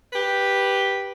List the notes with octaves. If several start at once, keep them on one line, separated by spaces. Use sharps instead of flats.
G4 B4